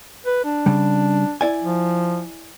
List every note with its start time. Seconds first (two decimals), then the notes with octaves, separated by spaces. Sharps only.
0.26 B4
0.45 D4
0.66 C#3 G3
1.41 E4 D5 G#5
1.62 F3